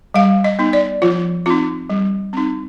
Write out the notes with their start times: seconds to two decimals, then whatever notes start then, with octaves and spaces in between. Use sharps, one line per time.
0.14 G3 F5
0.44 D#5
0.59 B3 D#4
0.73 D5
1.02 F3 F4
1.46 C4 D#4 F4
1.89 G3
2.33 C4 D#4